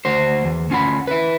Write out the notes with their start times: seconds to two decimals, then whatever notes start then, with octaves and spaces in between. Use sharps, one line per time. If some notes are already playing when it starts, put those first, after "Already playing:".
0.05 D2 F#4 C5
0.45 E2
0.70 D2 C#4 F4 F#5 B5
1.07 E4 B4